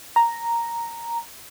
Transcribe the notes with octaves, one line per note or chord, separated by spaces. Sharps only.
A#5